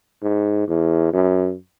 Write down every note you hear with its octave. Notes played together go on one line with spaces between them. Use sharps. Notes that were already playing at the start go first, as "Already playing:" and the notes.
G#2
E2
F#2